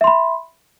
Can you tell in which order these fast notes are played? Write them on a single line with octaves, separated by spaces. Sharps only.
E5 C6 B5